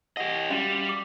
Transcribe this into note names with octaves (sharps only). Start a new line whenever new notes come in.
G4 D#5 F#5
G3 C#4 F#4 F5
D6